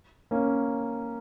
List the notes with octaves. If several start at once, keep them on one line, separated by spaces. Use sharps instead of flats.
A#3 C#4